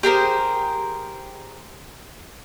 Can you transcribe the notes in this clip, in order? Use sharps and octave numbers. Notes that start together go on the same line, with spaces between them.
G4 G#4 A#4 C5